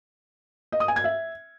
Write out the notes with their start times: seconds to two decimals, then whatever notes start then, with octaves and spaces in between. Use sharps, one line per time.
0.72 D#5
0.80 D#6
0.88 G#5
0.96 G#6
1.04 E5